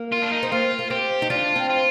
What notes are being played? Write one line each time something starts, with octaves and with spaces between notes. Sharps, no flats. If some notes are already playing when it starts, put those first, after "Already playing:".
Already playing: A#3
F4
D4
D#4
C4
A#3 F4
A#3
C4 G4
D#4
D4 F4
C4
F4